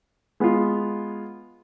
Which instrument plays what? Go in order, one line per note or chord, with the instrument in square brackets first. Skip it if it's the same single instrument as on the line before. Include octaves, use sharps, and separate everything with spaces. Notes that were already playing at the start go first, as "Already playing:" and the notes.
[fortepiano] G#3 B3 F4